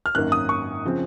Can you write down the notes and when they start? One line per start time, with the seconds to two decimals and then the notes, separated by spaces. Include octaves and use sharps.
0.06 F6
0.15 G#1 F#2 D#3 A#3 F#6
0.32 D#6
0.49 C#6
0.85 C#3 F3 C4